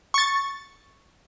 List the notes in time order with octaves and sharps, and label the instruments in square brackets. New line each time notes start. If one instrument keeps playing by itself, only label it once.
[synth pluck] C#6 A6